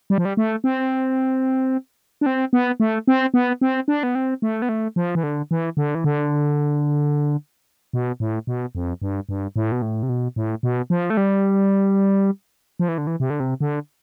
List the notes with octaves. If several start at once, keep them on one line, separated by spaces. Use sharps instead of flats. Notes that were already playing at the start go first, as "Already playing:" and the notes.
G3
F3
G3
A3
C4
D4
C4
B3
A3
C4
B3
C4
D4
B3
C4
A3
B3
A3
F3
E3
D3
E3
D3
E3
D3
B2
A2
B2
F2
G2
G2
A2
B2
A2
C3
B2
A2
B2
F3
A3
G3
F3
E3
D3
E3
C3
D3
C3
D3